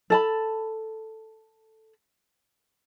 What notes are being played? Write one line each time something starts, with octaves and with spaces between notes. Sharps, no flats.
A4 A5 B5